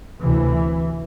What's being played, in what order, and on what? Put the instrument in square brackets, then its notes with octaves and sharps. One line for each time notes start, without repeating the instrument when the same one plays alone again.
[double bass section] D2 C3 E3